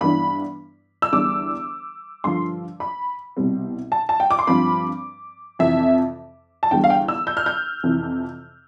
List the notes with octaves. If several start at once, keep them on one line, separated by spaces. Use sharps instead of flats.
G2 E3 B3 D4 B5
E6
E2 D3 G3 D4 D6
G2 D3 F3 C6
B5
C2 B2 G3 C4
A5
A5
G5
D6
C6
G2 F3 C4 B5
F2 C3 E3 E5
A5
E2 D3 G3 G5
F5
G5
E6
G6
F6
G6
F2 C3 E3